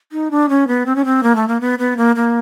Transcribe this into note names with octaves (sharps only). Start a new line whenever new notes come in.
D#4
D4
C#4
B3
C4
C#4
C4
A#3
A3
A#3
B3
B3
A#3
A#3